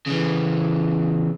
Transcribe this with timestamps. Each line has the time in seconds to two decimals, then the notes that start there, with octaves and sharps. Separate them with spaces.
0.07 C#3 E3